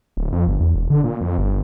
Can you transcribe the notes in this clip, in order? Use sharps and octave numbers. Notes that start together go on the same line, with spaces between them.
D1
F2
G1
E2
E1
D3
A#2
F2
G1